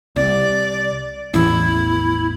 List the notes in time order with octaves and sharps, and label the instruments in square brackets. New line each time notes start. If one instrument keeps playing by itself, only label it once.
[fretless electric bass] C2 [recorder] D5
[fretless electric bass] A1 E2 [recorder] E4